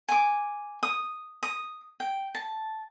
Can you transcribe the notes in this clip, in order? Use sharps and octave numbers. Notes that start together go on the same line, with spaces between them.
G#5 D6
D#6
D#6
G5
A5